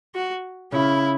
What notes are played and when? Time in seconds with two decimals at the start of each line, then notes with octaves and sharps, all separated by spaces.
0.15 F#4
0.72 C#3 C#4 E4